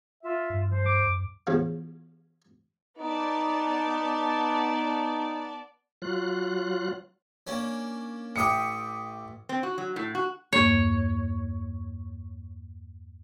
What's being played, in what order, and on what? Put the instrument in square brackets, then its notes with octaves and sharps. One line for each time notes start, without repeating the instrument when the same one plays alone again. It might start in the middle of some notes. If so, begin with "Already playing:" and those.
[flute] F4 [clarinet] E5
[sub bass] G2
[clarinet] F3 [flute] C5
[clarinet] D6
[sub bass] F#2
[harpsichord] E2 A2 C#3 F3
[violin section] B3 D5 A5 [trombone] D#4
[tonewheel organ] F#3 F4 F#6
[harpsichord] A#3 C#4 D4
[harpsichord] A1 E5 G5 [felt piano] D6 D#6 C#7
[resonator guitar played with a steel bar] C4
F#4
F#3
A2
F#4
[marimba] E2 G2 A#3 [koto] C#5